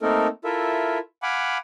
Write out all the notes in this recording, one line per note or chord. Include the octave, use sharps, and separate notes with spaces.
A3 A#3 C4 D#4 A4 A#4
E4 F4 A4 A#4 E5
F5 F#5 G#5 B5 D6